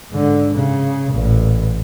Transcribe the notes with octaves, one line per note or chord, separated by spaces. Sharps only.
G#2 D3
C#3
A1 A#2